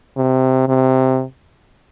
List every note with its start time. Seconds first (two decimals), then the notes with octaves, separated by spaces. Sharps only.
0.17 C3
0.68 C3